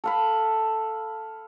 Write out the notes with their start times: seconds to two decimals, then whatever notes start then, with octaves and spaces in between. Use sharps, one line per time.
0.04 A4 F5 B5